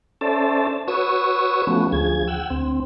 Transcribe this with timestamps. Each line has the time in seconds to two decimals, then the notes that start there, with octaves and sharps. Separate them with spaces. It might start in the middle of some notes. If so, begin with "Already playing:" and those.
0.21 C#4 A4 C5 D5 E5 A5
0.88 F#4 B4 C#5 C#6 D#6 E6
1.67 F3 A3 B3 C#4 F#4
1.92 D2 F3 G#4 G#6
2.28 F#5 G5 E6
2.50 D2 C4